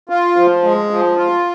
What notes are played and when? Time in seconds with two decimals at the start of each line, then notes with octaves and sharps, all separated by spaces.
0.09 F4
0.36 F3
0.64 G#3
0.90 F3
1.17 F4